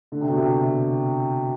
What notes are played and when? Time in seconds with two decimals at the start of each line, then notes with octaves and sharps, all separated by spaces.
0.12 D3
0.21 C3
0.29 B2
0.37 C3